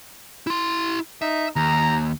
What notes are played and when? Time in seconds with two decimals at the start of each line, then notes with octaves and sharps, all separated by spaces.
0.47 E4 C6
1.22 D#4 E5
1.56 D#2 A#5